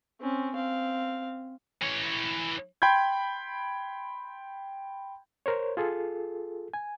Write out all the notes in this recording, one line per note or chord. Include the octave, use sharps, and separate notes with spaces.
C4 C#4
C4 F5
E3 C#5
G5 B5 C6 G6 G#6
A#4 C5 C#5
F4 G#4 A4
G#5